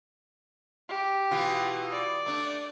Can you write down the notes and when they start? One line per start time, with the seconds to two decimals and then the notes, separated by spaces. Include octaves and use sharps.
0.89 G4
1.31 B2 E3 F4
1.91 D5
2.26 A3 D4